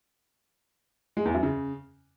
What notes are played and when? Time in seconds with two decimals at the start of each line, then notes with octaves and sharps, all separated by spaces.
1.17 G#3
1.25 E2
1.34 F#2
1.43 C#3